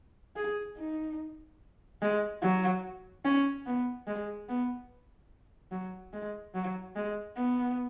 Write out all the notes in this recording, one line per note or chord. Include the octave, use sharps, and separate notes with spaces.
G#4
D#4
G#3
F#3
C#4
B3
G#3
B3
F#3
G#3
F#3
G#3
B3